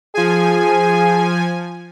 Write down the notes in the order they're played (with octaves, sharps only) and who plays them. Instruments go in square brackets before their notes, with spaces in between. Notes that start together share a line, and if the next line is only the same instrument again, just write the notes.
[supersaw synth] F3 G#5 [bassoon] G#4